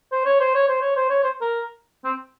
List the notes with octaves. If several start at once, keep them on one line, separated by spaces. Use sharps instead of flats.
C5
C#5
C5
C#5
C5
C#5
C5
C#5
C5
A#4
C4